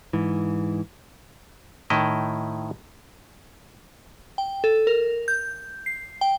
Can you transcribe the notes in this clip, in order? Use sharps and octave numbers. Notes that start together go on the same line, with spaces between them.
G#2 E3
A2 D#3 E4 D#5
G5
A4
A#4
G6
C7
G5